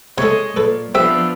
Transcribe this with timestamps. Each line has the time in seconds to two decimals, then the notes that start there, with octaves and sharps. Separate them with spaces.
0.18 C3 G#3 A4 C#5 D#5
0.56 A#2 A4 B4
0.95 F3 B3 C4 D4 G4 E5